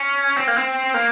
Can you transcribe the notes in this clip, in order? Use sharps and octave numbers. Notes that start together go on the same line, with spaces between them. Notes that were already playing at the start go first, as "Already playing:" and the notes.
Already playing: C#4
C4
A#3
C4
A#3